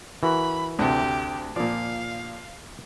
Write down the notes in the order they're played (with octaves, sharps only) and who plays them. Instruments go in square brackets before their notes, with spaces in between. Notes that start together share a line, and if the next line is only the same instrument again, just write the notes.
[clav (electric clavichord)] E3 F#4 A#4 [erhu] B5
[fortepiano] D2 C3 [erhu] G4
[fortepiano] A#2 F3 [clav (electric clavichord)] D5 [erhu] F5